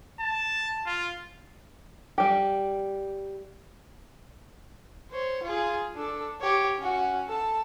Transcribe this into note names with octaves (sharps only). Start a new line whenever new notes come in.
A5
F4
G3 G4
C5 C#5
F4 G#4
D4 A4
G4 C#5
C#4 F#4
A4 A5